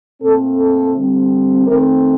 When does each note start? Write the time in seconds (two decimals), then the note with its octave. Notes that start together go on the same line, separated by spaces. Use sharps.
0.21 A#2 A3 C4 A4
0.57 A4
0.93 D3 G3 C4
1.65 D#3 A3 C4 A#4